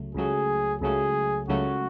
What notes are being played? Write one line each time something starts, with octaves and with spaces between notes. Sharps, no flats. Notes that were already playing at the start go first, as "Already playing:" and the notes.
Already playing: C#2 C#3 F#3 A3
C#2 C#3 F#3 A3 G#4
C#2 C#3 F#3 A3 G#4
C#2 C#3 F#3 A3 F#4